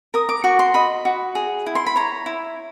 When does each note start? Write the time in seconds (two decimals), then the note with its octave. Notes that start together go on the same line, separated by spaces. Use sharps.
0.14 A#4 D#6
0.29 D6
0.44 F#4 C#6
0.59 C6
0.74 D#5 B5
1.05 F#4
1.35 G#4
1.66 E4
1.75 C6
1.86 B5
1.96 C#5 A#5
2.26 E4